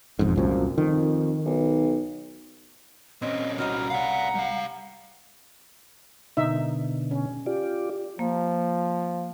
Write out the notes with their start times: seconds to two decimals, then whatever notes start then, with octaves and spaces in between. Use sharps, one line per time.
0.19 E1 F2 G#2
0.36 C2 F#2 A#2 F3
0.78 F2 D#3
1.46 B1
3.22 A#2 C4 C#4 D#5
3.58 C2 F#4 D#5 A#5 B5 F6
3.90 C2 D5 F5 F#5
4.35 G3 F5
6.37 B2 D3 D#4 E5
7.11 C#4
7.46 F4 G4 D5
8.19 F3 A#3